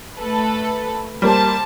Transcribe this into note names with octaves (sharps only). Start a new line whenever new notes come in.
A3 A4 B4
G3 A#3 G4 C5 A5